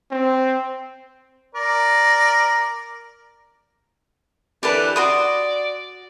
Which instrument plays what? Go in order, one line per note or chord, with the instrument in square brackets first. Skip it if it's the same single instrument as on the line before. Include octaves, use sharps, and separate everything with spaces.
[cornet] C4
[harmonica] A#4 D5
[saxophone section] D3 E3 D4 [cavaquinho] G4 A4 B4
[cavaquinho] F#4 C6 D#6 [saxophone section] D5